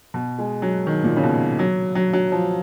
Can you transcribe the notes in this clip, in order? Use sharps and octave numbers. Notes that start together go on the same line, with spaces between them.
B2
G#3
F#3
D#3
A#2
C#3
B2
F#3
F#3
F#3
F3